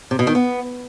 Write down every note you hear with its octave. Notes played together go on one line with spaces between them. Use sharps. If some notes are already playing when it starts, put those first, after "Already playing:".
C3
B2
D#3
B3